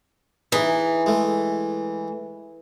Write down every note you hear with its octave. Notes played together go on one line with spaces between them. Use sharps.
E3 D#4 G#4
G#3 A3